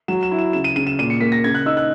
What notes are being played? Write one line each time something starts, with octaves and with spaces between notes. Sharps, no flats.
F#3 E7
E7
E4
E7
C#3 E7
D#7
C#3 D#7
E7
A#2 D#7
C#7
A#3 B6
A#6
C#3 G#6
F#6
D#4 E6
F#6